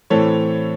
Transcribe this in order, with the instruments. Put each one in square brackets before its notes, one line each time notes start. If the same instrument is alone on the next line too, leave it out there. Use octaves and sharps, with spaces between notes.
[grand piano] A2 E3 C4 A4 C#5